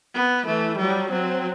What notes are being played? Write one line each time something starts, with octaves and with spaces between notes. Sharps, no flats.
B3
E3 A3
F#3 G3
F#3 C4